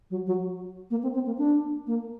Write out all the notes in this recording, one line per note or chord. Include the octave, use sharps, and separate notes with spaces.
F#3
F#3
A#3
C4
C4
A#3
D4
A#3